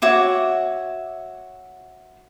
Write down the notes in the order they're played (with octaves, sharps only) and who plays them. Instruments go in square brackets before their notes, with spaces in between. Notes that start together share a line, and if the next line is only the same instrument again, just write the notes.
[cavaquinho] F#4 C#5 E5 D6